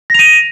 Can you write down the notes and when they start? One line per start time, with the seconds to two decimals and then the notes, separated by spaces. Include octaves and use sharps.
0.10 A#6
0.14 F7
0.19 D#7